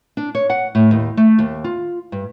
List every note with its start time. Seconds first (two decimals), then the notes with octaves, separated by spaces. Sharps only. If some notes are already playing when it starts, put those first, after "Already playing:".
0.17 D4
0.35 C#5
0.50 F#5
0.75 A2
0.91 D#2
1.17 A3
1.39 D#2
1.64 F4
2.12 G2